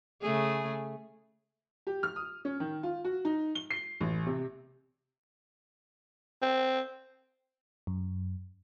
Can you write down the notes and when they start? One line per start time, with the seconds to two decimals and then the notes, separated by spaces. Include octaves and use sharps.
0.21 C#3 A3 G#4
1.87 G4
2.03 F6
2.16 D#6
2.45 C#4
2.60 D#3
2.83 F4
3.05 F#4
3.25 D#4
3.55 G7
3.71 C7
4.01 A1
4.26 C3
6.42 C4
7.87 F#2